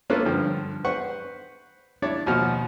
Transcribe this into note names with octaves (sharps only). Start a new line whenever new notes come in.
A#3 C#4 D4 F4 A4 B4
G2 D3 F3
B4 C5 F#5 C#6
D4 E4 C#5 D5
D#2 B2 F3 F#4 F6